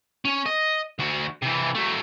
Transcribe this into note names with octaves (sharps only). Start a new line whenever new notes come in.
C#4
D#5
D2 F#4
C3 E3
F#3 A3